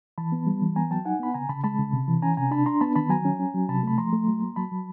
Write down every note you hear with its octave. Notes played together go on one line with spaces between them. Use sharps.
E3 A5 B5
B3
G3
E3
B3 G#5 A#5
F#3 G5 A5
D#4 F#5 G#5
B3 B5
C#3 G#5 A#5
C#3 A5 B5
G#3 A5 B5
C#3
C3
E3
C#4 G#5 A#5
C3 G#5 A#5
D4 A5 B5
D4 A#5 C6
B3 A5 B5
D#3 A5 B5
F#3 G#5 A#5
C#4
C#4
F#3
C3 A5 B5
A3 B5
F3 A#5 C6
A3
F#3
A#3
F#3 A5 B5
F#3